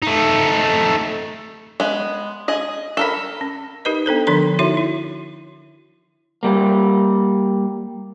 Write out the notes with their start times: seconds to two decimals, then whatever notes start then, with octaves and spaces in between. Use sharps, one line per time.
0.03 A3 D#4
1.80 G#3 B3
2.48 G#4 D#5
2.97 A4 A#4 B5
3.41 C#4
3.85 D#4 G4 A#4 B4 D#5
4.06 B3 D4 A4 C5
4.27 D3 F3 D4 A4 C6
4.59 D#4 E4 F#4 C#5 E5 C6
4.77 E4
6.43 G3 A#3